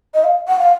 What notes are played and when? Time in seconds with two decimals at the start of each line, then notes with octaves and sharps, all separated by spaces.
0.14 D#5
0.24 F5
0.48 F#5
0.59 F5